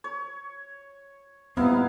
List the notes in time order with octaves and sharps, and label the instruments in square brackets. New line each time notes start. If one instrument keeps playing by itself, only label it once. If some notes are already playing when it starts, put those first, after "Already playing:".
[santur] C#5
[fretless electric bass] A#2 G3 C4 [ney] B3 [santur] D#4 E4 F5